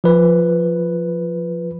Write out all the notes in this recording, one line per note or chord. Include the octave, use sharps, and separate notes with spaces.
F3 B4